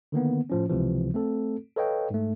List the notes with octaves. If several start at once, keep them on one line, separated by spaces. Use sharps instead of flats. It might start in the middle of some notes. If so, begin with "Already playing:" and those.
D3 D#3 A#3 B3
A2 F3 C#4
C#2 C3 E3 F3
A3 C4 A4
A4 B4 C#5 D#5 F5 G5
G#2 A3